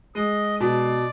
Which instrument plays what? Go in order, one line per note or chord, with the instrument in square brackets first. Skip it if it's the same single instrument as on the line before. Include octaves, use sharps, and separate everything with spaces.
[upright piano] G#3 [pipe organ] D#5
[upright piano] B2 [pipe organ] D5